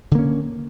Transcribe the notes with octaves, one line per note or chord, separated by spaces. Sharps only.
D3 A#3 C#4